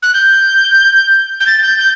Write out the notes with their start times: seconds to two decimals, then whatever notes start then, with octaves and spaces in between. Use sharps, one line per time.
0.03 F#6
0.14 G6
1.40 G6
1.47 A6
1.63 G6
1.79 G6